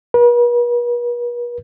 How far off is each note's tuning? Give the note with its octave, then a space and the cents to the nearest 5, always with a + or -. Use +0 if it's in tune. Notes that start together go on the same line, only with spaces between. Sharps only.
B4 -45